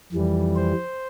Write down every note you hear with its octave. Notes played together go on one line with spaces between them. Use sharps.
F2 E3 G3
C5